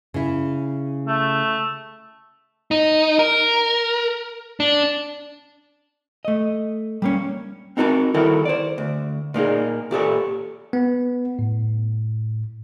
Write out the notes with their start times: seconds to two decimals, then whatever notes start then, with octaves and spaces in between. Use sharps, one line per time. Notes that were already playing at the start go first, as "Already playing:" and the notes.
0.14 C#3 E4
1.07 A3
2.71 D#4
3.19 A#4
4.60 D4
6.25 A3 D#5
7.02 G3 A#3 C#4
7.77 C4 D#4 F#4 A#4 A5
8.14 D#3 G3 E4 F#4 A4 A#4
8.45 C5 D5
8.78 D2
9.34 A#2 A#3 D#4 G#4
9.91 A#2 G4 A4 C#5
10.73 B3
11.39 A2